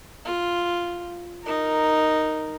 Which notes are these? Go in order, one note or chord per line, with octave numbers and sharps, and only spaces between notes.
F4
D#4 A#4